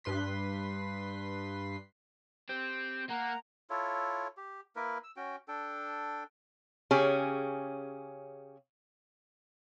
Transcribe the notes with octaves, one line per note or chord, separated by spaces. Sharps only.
G2 B4 C6 B6
C4 G4
A#3 F#5 A#5
E4 F4 A4 C#5
G4
A#3 E4 A#4 B4
E6
C#4 F#4 G5
D4 A4 G5
C#3 C#4 G4 G#4